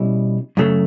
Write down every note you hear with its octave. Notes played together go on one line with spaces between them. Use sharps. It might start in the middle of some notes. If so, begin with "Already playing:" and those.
Already playing: B2 G3 C#4 E4
F#2 C#3 F#3 A3